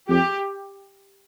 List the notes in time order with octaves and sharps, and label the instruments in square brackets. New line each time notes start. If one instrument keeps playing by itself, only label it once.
[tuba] F2 [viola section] G4